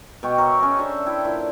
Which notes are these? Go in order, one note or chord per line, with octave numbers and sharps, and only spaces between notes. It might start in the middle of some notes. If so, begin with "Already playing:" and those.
B2 G4 G5 C#6
A#4 C#5 E5
C#4 G#4 A#4 D#5
D4 A4 C5 E5
E4 G5
A#2 E4